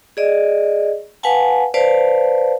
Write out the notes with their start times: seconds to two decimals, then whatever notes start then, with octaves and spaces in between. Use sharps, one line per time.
0.17 G#4 D5 D#5
1.23 B4 F5 F#5 G#5 A5
1.74 B4 C5 D5 F5 A5